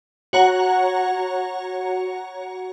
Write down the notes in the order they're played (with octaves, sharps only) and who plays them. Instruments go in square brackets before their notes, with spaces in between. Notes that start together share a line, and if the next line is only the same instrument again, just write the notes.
[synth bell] F#4 C#5 F#5 A#5